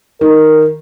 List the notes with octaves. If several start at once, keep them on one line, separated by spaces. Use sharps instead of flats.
D#3 A#4